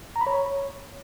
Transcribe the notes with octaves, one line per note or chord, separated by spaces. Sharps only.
A#5
B5
C#5